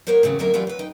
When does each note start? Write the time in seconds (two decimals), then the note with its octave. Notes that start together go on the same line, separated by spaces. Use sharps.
0.07 A#3 B3 A#4 C5 C#5
0.23 E2 C#3 F#3 C4
0.39 D2 D3 F#3 A#3 A#4 E5
0.54 E3 F#3 F4 G4 D5
0.67 F#3 B4
0.79 D#4 G5